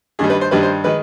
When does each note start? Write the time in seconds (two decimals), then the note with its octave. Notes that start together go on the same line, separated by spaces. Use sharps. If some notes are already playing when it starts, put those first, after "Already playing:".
0.19 G2 D#3 G3 G#4
0.30 B4
0.41 C5
0.51 G2 D#3 G3 B4
0.63 C5
0.84 D#3 G#3 B4